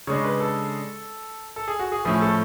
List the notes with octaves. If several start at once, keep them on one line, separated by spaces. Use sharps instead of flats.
C#3 G#3 D4 C#5
B4
A4
A4
G#4
F#4
G#4
A2 F3 A3 C#4 G#4
A4